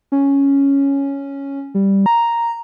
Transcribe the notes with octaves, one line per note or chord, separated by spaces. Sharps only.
C#4
G3
A#5